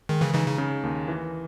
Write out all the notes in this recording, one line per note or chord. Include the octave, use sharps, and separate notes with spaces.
D#3 G#3
C#3 E3
C#3 E3 D#4
C#3
C#3
D#2
E3